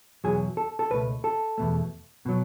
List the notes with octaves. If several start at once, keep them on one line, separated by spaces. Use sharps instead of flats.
E2 B2 F#3 G#4
A4
A4
C#2 B2 A3 B4
A4
E2 B2 A3
B2 F#3